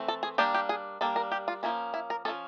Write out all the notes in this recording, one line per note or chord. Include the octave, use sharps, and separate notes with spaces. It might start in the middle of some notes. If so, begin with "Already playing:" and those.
Already playing: E3 A3 C4
A4
G#4
G3 A#3 D4 G4
G4
G#4
G3 A#3 D4 A4
A#4
G4
F4
F3 A#3 C#4 E4
E4
A#4
F3 A#3 C#4 A4